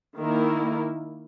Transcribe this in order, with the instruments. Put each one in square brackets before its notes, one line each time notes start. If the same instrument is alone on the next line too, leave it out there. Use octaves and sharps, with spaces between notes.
[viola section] D#3 A#3 E4 A#4